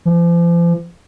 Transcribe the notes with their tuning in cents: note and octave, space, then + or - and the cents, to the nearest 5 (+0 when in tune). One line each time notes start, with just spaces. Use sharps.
F3 -40